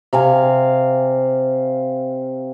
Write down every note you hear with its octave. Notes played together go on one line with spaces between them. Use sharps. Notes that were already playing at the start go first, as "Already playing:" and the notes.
C3 F5 G#5